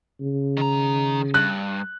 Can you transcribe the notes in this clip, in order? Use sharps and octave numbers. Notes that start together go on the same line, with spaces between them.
C#3
D#3 A#5
G2 F#6